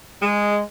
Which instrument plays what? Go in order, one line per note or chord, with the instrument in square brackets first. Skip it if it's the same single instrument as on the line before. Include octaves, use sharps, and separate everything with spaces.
[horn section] G#3